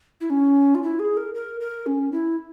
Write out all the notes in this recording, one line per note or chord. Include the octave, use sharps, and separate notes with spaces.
E4
C#4
F4
E4
G#4
A#4
A#4
A#4
C#4
E4